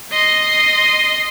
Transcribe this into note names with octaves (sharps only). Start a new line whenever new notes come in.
D#5 C6